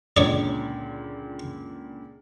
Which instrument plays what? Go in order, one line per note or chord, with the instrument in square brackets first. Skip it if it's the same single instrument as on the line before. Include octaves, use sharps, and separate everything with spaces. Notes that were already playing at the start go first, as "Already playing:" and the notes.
[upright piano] C#2 A#2 D3 [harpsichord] C#5 D5